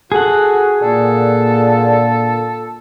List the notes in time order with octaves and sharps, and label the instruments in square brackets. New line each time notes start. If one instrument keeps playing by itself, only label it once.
[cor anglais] F#4 [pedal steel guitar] G#4 F#5 [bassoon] A4
[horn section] A#2 [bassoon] D3 [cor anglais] A4